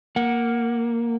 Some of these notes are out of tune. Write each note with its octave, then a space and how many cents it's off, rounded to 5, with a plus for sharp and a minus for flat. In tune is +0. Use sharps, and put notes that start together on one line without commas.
A#3 +0 F#5 +0